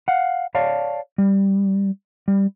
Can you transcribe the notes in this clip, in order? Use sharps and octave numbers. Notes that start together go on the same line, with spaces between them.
F5 F#5
C#5 D5 F5 A5
G3
G3